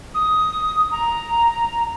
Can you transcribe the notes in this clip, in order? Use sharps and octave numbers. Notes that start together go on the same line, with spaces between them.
D#6
A#5